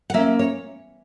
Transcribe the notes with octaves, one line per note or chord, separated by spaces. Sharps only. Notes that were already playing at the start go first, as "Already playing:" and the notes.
F#5
A#3 C#4 E5
C#5